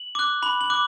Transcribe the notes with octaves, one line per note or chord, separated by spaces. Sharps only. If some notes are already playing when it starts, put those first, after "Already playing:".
Already playing: F#7
D6 F#6
B5 F#7
F#7
D6 F#6